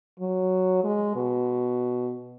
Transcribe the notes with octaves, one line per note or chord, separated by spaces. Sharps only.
F#3
G#3
B2